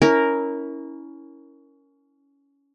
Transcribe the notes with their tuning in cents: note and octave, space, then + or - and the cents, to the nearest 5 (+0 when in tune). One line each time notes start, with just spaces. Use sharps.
C#4 +15 E4 -20 A#4 +0